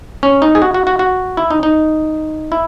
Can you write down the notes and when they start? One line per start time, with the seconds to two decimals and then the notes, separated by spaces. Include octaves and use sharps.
0.23 C#4
0.42 D#4
0.55 G#4
0.62 F#4
0.74 F#4
0.87 F#4
0.99 F#4
1.37 E4
1.51 D#4
1.63 D#4
2.52 E4